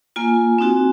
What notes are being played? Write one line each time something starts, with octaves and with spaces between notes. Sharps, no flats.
A#3 F4 G#5
C4 D#4 F#4